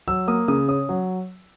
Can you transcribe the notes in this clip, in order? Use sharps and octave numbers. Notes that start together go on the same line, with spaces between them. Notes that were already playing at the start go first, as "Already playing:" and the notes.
F#3 E6
A#3 D#6
C#3 D#6
C#4 D#6
F#3